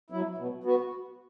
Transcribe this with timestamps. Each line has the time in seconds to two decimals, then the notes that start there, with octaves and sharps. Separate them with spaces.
0.10 F#3 E4
0.37 B2
0.64 B3 F#4